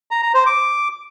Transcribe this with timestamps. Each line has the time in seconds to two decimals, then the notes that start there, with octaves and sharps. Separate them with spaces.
0.11 A#5
0.23 A#5
0.34 C5
0.46 D6